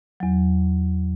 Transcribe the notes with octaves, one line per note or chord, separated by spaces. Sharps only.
E2 F#3